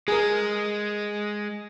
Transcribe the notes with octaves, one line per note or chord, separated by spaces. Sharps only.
G#3 G#4 A#4